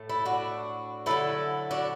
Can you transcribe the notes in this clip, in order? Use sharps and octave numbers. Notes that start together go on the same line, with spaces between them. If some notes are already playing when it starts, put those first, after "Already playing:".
Already playing: A2 A3
E4 A4
D4 F#4
D3 F#3 A3 E4 A4
D4 F#4